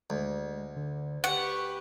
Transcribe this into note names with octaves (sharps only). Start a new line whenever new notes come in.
D2 G#3
D3
G4 B4 F#5 C#6